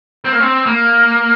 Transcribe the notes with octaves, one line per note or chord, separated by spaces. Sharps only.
C4
A#3
C4
A#3